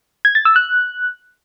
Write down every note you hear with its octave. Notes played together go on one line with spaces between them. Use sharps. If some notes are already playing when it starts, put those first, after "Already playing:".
G#6
A6
E6
F#6